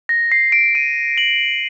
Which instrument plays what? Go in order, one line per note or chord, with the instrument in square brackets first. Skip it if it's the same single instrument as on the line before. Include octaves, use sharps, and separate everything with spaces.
[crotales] A#6
C7
D7
D#7
F#7